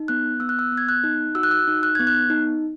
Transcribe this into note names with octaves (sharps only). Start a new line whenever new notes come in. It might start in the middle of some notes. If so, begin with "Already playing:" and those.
Already playing: D#4
B3 F#6
B3 E6
F#6
E6
B3
G#6
F#6
D#4
F#4 E6
F#6
E6
D#4
F#6
B3 G#6
F#6
D#4